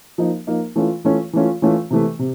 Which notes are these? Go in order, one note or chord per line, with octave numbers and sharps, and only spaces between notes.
F3 A#3 D#4
F3 A#3 D#4
E3 A3 C#4 F4
E3 A3 C#4 F4
E3 A3 C#4 F4
E3 A3 C#4 F4
C3 E3 A3
C3